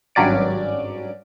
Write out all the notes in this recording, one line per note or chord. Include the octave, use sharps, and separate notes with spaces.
G#1 G2 F#3 C#4 D5 D7